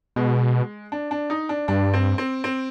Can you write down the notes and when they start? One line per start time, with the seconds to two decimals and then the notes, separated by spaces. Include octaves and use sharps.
0.16 B2 G#3
0.92 D4
1.11 D4
1.30 D#4
1.49 D4
1.68 G2 D4
1.94 C4
2.18 C4
2.44 C4